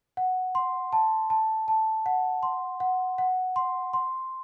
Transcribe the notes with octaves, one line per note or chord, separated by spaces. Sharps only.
F#5
C6
A5
A5
A5
F#5
C6
F#5
F#5
C6
C6